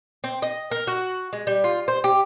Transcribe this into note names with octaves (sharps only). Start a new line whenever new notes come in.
C4
D#5
A#4
F#4
G#3
G3
F4
C5
G4